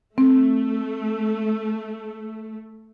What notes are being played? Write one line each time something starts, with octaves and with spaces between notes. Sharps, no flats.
A3 C4